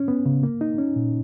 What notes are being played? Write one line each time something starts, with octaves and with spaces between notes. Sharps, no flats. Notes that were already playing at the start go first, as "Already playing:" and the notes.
Already playing: C#4
B3
C#3
A#3
D#4
C#4
A#2